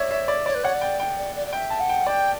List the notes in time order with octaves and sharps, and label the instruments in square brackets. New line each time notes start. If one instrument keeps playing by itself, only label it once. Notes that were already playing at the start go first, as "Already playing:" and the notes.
Already playing: [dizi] C#5 [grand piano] D5 E5
[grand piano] E5
D5
[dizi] C#5 [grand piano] D5
[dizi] B4
[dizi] C#5 [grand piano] F#5
[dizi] D5
[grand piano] G5
G5
[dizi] D5
D5
D5
[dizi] E5 [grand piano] G5
[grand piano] A5
[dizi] F#5
[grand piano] G5
[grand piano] D5 [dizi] G5